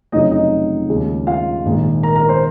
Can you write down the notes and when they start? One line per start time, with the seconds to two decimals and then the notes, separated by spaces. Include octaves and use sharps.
0.12 F1 F2 C#3 F#3 D#4 D#5
0.31 D#4 D#5
0.88 D#2 C#3 F3 G#3
1.27 F4 F5
1.65 A#1 G#2 D#3 G#3
2.03 A#4 A#5
2.16 A#4 A#5
2.29 C5 C6